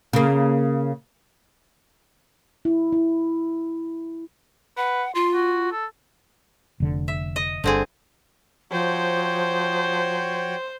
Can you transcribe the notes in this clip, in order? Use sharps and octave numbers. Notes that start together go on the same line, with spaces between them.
C#3 A#3
E4
E4
B4 F#5
F4 C6
F#4
A4
F1 D3
E5
D#5
G1 D3 C4 G#4
F3 F#4 C5 C#5 G5